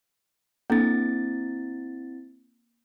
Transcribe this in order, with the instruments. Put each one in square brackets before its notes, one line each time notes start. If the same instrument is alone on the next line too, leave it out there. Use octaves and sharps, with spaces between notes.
[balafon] A#3 D4 A4 [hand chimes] C4 E4 A6